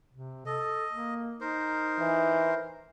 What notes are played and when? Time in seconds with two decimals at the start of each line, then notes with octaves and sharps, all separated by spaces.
0.12 C3
0.46 A4 D#5
0.92 A#3
1.41 D#4 A#4 C5
1.99 E3